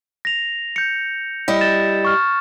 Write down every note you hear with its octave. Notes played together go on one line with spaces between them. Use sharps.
A#6 F7
G6 C#7
G3 E4 D#5
A6 E7
C#6 F6